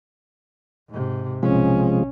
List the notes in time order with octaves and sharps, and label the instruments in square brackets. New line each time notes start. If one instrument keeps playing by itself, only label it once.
[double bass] G#2 C3
[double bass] B1 C#4 [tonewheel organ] C3 F3 G#3